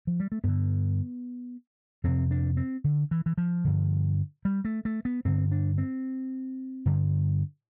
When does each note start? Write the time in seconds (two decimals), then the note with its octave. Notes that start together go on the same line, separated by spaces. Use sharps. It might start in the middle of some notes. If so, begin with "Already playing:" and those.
0.07 F3
0.20 G3
0.32 A3
0.44 G2 D3 B3
2.04 F2 C3 C4
2.31 D4
2.57 C4
2.84 D3
3.11 E3
3.26 E3
3.38 F3
3.65 G2 D3
4.45 G3
4.65 A3
4.85 A3
5.05 B3
5.25 G2 D3 C4
5.52 D4
5.78 C4
6.86 G2 D3